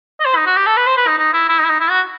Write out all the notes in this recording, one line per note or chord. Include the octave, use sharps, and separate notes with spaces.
D#5
C5
D#4
F#4
G4
A4
B4
C5
B4
D#4
D#4
E4
E4
D#4
E4
D#4
E4
F#4